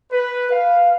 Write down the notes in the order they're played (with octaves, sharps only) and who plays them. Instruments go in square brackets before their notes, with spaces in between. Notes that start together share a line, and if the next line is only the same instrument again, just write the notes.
[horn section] B4
F5